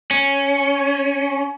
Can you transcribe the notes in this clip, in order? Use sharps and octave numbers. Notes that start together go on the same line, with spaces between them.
C#4